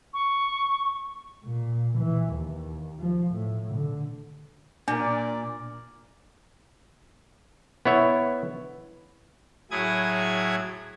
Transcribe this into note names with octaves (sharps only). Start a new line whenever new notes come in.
C#6
A#2
E3
D#2
F3
A2
D3
A#2 D4 A#4 D5
B3 E4 C#5 E5
A2 F#3 E4 G#4 D#6 G#6